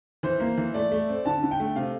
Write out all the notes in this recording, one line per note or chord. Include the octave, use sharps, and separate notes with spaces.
E3 C5
A#3
E3
A3 D5
A3
C4
D3 A5
D3
G5
A3
C3 F5